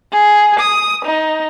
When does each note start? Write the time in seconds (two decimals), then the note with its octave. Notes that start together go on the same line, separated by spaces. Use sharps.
0.13 G#4
0.59 D#6
1.05 D#4